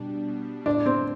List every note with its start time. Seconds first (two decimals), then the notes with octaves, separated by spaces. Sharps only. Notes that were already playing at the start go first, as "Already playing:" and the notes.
Already playing: B2 G3 D4
0.28 B2
0.66 A2 D4
0.86 C4